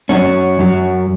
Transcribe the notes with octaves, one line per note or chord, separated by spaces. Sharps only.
F#2 F#3 C#4
F#2 F#3